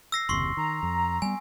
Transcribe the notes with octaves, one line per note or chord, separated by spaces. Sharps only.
E6 A#6 C7
F#1 D#2 C3 C6 C#6 C7
D#3 A#5
F2
G3 B3 G#5